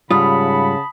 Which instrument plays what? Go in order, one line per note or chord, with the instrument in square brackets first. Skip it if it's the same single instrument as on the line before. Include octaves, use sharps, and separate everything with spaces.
[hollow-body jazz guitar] G#2 G3 F4 [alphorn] C#3 [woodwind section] F#5 A5 B5 [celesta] D#6